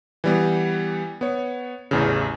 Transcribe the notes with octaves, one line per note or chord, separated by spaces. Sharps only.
E3 G3 B3
B3 C#5
A1 E2 C#3